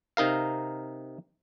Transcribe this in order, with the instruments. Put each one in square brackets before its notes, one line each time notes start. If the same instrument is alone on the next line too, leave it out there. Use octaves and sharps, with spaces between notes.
[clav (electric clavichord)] C3 D#4 A#4 F5